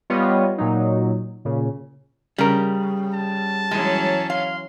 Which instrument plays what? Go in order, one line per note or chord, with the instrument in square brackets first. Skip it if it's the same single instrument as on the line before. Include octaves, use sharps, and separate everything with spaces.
[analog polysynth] G3 B3 F4 C#5 D#5 F5
A#2 F#3 D#4
A#2 C#3
[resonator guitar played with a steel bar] C#3 [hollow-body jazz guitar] G3 A#4
[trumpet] A5
[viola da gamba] E3 F#3 C#4 [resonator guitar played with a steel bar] G#3
[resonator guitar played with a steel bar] F5 [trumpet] C6